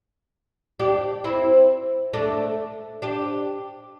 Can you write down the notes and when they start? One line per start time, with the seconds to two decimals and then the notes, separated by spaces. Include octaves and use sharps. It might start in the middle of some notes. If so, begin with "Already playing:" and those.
0.80 D4 G4
1.24 C4 E4
2.13 A3 D4
3.02 D4 G4